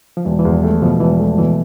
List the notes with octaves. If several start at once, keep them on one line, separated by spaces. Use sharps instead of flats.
F3
E1 E3
E3
E2 F3
G3 A3
B2 F3
E1 E3
A3
B2 E3